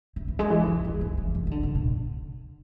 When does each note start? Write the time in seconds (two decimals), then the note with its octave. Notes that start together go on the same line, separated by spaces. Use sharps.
0.16 E3
0.28 E3
0.39 G#3
0.50 E3
0.67 D#3
0.84 E3
1.01 F3
1.17 E3
1.35 D#3
1.47 D#3
1.51 D3
1.63 D3
1.75 B2